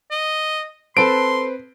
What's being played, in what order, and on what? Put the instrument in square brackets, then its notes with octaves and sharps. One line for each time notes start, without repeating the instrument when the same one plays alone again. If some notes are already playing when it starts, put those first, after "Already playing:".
[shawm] D#5
[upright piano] C4 B4 [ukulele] A4 A5 B5 [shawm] C6 [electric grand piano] D7